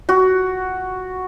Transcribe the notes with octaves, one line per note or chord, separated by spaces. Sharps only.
F#4